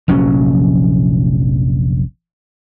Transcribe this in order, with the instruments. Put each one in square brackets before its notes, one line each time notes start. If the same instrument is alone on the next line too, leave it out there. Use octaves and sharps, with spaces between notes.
[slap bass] F1 A#1 F#3 C#4